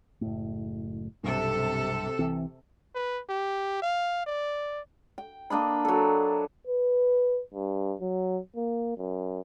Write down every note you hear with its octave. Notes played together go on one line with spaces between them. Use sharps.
F#1 A2
B1 G2 C3 A4
C2 E3 C4
B4
G4
F5
D5
G5
A#3 D4 D#5 B5
F#3 A4
B4
G2
F#3
A#3
F#2